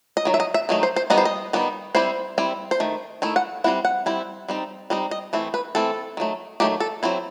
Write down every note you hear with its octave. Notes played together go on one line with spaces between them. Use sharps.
D#5
D#3 F#3
E5
D#5
E5
D#3 F#3 A3 D#4
C5
C5
D#3 G3 B3 D#4 D#5
C5
D#5
D#3 G3 B3 D#4
G3 C4 E4 C5
G3 C4 E4
C5
D#3 A3
D#3 A3 E4
F#5
G3 C4 E4 F#5
F#5
G3 C4 E4
G3 C4 D#4
G3 C4 D#4 D#5
D#5
E3 A3 C4 E4
B4
E3 A3 C4 E4 A4
D#3 F#3 A3
D#3 F#3 A3 G4
A4
F#3 C4 E4